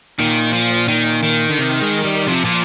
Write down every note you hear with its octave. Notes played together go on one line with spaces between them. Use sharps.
A#2 D#3
F3
D#3
D#3
D3
C3
G#3
G3
C3 F3
A#2